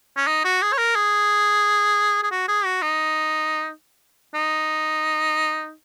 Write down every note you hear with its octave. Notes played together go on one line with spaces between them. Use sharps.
C#4
D#4
F#4
G#4
C#5
A#4
G#4
G#4
F#4
G#4
F#4
D#4
D#4